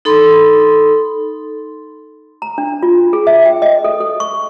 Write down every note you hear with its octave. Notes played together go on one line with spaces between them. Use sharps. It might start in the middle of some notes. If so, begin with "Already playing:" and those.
D#4 A4 B5 C6
A#5
D4
F4
G#4
E5
G5
D#5
A4
A4
C#6